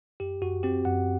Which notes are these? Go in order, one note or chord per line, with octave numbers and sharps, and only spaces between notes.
F#2 G4
F#2 F#4
C4 G4
F#2 F#5